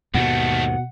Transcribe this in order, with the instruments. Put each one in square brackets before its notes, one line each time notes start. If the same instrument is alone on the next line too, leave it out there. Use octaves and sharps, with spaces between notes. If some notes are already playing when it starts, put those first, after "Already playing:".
[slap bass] D#2 G#2 [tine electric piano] B2 [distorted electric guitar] D#3 A3 [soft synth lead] F#5